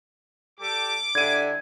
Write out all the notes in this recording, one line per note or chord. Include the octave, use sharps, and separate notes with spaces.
G3 G4 A4 D6
D3 G3 D4 E4 G#6 D#7